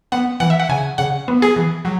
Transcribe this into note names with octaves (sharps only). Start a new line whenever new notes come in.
B3 F#5
E3 F#5
E5
F#5
C#3 G#5
C#3 F#5
B3
G#4
E3
F#3